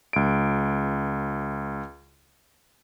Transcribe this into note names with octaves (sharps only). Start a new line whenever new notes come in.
C#2 D7